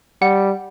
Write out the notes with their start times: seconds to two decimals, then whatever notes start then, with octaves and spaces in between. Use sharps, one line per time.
0.22 G3 F#5